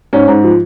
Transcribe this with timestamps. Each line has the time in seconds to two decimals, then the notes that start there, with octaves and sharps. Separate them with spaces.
0.13 G#2 C#4
0.28 G#2
0.44 F3